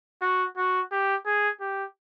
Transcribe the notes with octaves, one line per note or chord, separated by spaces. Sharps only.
F#4
F#4
G4
G#4
G4